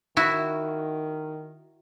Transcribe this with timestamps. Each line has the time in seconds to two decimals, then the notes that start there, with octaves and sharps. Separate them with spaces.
0.17 D#3 E4 F#4